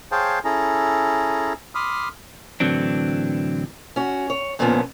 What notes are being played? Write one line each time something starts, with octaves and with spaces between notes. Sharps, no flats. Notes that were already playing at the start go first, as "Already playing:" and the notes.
G#4 C5 C#5 F5 G5 A5
C#4 E4 G#4 A4 A#5
B5 C6 D6 D#6 F6
A2 D3 E3 F#3 C4 D4
C#4 F#4
C#5
F2 A#2 D3 F3 B3 C#4